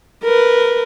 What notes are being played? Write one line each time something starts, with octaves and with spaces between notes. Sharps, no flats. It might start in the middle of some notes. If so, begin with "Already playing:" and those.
A#4 B4